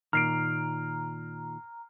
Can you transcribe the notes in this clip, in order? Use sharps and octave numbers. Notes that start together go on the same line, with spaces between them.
A#2 D#3 A#5 F6 C7 D7